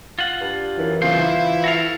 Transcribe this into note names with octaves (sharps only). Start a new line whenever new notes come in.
F4 F#5
G2
F#2 E3
E2 C#3 F4 C5
E4 F4
F#4 A4 F5